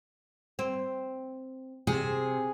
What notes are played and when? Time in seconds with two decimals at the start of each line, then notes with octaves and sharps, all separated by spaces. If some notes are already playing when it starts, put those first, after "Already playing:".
0.59 C4
1.87 C3 G#4